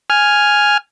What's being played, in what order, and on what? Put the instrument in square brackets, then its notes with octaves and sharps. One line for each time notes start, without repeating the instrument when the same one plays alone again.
[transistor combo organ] G#5 F6